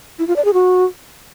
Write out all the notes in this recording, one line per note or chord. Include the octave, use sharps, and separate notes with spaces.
E4
F4
D5
G#4
F#4